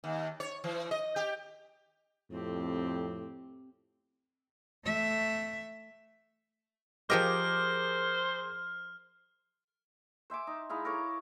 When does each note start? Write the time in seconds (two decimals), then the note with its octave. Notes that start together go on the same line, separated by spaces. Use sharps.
0.04 D#2
0.40 C#5
0.64 E3
0.91 D#5
1.16 G4
2.31 F2 A2 C4 G4
4.84 A3 E5
7.10 F3 G4 G#4 A#4 C5 D#5 D6 F6
10.30 C5 E5 G#5 D6
10.47 D#4
10.69 G#3 D#4 E4 F5
10.84 A4 A#4 C#5 D6